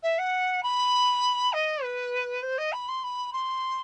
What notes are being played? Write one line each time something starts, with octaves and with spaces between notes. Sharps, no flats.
E5
F#5
B5
D#5
B4
C5
D#5
B5
C6
B5
C6